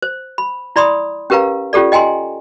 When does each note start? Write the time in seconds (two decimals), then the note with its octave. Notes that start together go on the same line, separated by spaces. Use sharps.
0.02 C5
0.38 B5
0.76 E4 D5 B5 C6 D#6
1.30 C#4 G4 A#4 B4 F5 A#5
1.73 C#4 F4 G4 A4 D5
1.92 D#5 G5 G#5 A#5 C6